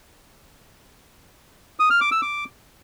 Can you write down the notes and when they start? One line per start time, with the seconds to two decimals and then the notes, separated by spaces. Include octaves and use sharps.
1.80 D#6
1.90 F6
2.01 D6
2.12 E6
2.22 D6